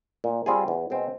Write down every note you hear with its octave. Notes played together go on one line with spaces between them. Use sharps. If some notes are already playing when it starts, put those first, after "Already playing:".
A#2
G3 C4 F4 G#4
E2
B2 G#3 C4